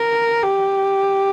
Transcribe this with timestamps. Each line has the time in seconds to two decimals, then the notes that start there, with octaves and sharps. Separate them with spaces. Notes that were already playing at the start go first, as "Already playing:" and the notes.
Already playing: A#4
0.43 G4